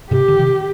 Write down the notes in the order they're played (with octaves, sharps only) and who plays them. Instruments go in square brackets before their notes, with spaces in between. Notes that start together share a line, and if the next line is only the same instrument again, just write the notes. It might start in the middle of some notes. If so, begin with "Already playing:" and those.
[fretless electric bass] G#2 C3 [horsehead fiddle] G4
[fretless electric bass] D3
C3 D#3